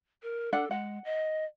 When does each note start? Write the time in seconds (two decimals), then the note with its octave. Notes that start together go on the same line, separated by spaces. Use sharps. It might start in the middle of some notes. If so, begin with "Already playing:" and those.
0.23 A#4
0.53 D4 A4 F#5
0.71 G#3 F#5
1.05 D#5